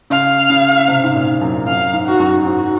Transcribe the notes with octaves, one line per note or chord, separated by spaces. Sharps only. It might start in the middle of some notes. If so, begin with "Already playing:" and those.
C#3 F5
C#3
C3
G#2
A#2
F#2
F#2 F5
G#2
G#2 F#4
F#2
G#2 F#4